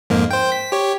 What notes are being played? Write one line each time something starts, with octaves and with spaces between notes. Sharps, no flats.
F2 G#2 A#3
C5 G5
B6
G4 C#5